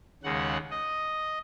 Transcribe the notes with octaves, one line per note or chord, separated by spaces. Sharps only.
D#2 C#3 G#3 F#5
D#5